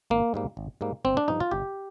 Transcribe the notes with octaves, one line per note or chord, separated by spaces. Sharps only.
G#1 A#3
G#2 G3 A#3
G#1
G#2 G3 A#3
G1 C4
D4
G2 F3 D#4
F4
G1 G4